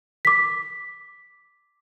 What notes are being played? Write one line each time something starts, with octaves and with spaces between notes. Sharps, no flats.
D6 B6